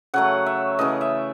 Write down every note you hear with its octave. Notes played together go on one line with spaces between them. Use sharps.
C#3 F#3 A3 F#5
E5
C#3 E3 A3 D#5
E5